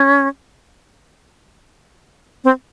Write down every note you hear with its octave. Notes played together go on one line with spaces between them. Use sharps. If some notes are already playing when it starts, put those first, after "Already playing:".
Already playing: C#4
C4